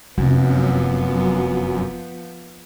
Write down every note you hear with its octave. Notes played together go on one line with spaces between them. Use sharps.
F1 F#2 F3 B3